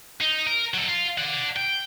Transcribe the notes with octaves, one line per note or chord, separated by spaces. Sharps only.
D#4
A#4
F#3 A4
F4
D5 F#5
G5